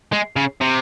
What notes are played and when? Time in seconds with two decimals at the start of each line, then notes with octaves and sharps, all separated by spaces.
0.12 G#3
0.36 C#3
0.61 C3